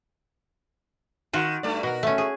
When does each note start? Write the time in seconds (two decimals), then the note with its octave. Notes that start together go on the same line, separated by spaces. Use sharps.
1.33 D#3 F4 F#4
1.63 G2 A3 D5
1.83 B2 F#4 A#4
2.03 A3 C#4
2.18 G#4